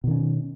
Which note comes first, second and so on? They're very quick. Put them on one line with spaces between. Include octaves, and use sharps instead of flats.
B2 D#3 C#4